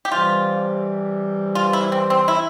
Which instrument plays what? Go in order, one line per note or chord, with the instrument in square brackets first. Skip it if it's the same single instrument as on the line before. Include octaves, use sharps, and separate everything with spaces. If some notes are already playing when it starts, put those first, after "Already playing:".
[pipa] G4
[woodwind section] C3 E3 G3 [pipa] F4
[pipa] F4
E4
C4
C4
E4